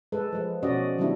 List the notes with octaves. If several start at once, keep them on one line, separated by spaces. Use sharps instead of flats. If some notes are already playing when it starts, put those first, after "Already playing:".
G#3 A4 B4
F3 G#3
B2 F3 C#4 F#4 D5 D#5
D#3 F#3 G3 B3 D4 E4